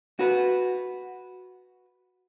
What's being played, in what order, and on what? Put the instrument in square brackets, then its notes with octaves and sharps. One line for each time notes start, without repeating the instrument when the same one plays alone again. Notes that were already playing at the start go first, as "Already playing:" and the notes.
[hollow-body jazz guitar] F#4 B4